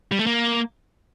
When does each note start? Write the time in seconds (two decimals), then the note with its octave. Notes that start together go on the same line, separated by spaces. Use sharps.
0.12 G3
0.19 A3
0.26 A#3